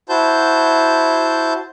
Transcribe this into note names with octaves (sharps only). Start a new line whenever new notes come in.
E4 F#4 C5 A5 G6